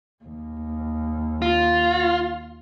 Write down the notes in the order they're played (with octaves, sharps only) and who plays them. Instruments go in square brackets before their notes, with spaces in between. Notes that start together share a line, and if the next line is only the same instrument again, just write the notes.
[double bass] D#2
[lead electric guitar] F4